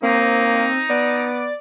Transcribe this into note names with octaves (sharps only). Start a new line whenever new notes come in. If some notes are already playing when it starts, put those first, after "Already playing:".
A#3 C4 D#4
B3 D5